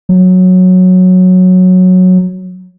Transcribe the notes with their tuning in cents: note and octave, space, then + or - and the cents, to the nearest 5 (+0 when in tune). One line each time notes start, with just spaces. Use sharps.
F#3 -10